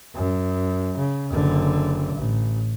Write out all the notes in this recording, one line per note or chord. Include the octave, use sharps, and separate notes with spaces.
F#2
C#3
F#1 D3
A1